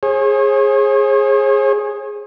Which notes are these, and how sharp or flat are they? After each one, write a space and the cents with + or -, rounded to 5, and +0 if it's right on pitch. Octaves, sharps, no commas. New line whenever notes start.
G#4 +0 C#5 -45